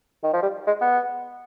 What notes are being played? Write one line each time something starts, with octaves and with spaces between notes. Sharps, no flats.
D#3
F3
G3
G#3
B3